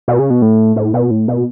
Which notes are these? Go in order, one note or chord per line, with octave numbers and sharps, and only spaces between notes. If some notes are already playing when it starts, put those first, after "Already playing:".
B2
C#3
B2
A2
A2
B2
A2
B2